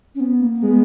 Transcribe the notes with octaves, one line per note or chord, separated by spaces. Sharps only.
C#4
B3
A#3
A#3
G#3 B3